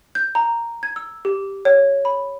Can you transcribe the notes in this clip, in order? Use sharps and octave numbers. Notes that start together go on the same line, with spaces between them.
G6
A#5
G#6
E6
G4
C#5
B5